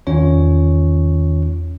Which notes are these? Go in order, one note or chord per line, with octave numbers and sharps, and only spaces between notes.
E2 D#3 C#4 F4 C#5